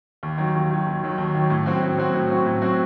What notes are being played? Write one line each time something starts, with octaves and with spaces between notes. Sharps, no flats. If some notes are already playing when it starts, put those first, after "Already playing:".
D#2
D#3 F#3
D#2
D#3 F#3
D#2
D#3 F#3
D#2
D#3 F#3
A2
F#3 C4 F#4
A2
F#3 C4 F#4
A2
F#3 C4 F#4
A2
F#3 C4 F#4